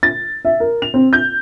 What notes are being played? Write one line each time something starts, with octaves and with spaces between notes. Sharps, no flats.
A6
E5
A#4
F7
C4
G6